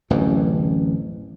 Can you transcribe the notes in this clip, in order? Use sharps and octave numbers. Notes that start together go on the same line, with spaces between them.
D1 A1 F#2 E3